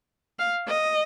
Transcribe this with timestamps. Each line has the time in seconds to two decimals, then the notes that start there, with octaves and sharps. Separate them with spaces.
0.39 F5
0.68 D#5